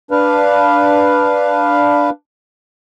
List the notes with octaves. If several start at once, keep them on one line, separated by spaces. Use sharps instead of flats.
D4 B4 F5